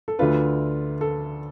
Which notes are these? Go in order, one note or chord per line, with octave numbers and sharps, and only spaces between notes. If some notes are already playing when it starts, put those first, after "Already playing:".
A4
D2 D3 A3 D4 F4 B4
A4